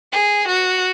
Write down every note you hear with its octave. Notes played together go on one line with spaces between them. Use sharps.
G#4
F#4